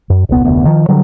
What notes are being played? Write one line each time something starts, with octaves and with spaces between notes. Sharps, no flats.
F#2
D#1 C2 B3
F1 D2 B3
D#3 F3
D3 F#3 G3